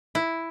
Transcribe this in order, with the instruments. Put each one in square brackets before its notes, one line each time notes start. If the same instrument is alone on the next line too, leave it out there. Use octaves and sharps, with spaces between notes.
[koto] E4